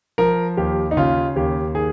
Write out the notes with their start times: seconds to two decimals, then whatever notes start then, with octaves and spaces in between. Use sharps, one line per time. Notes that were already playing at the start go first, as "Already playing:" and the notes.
0.18 F3 A#4
0.57 D#2 G4
0.91 D#4
0.97 C#3 F4
1.36 D#2 G4
1.75 D#3 G#4